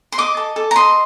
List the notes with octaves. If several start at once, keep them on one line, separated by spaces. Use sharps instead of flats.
C6
D#5 D6
A4
A4
A#5
D#5 C6